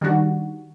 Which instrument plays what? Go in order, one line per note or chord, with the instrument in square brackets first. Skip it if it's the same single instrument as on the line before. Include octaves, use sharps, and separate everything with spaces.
[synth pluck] D#3 G3 D4 F#4